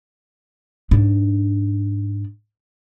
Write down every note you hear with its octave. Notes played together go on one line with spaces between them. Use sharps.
G#2 D4